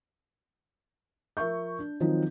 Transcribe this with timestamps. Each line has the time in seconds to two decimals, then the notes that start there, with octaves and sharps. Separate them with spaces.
1.37 F3 A#4 E5 C#6 G6
1.79 D4
2.00 D#3 F3 F#3 C4 D#4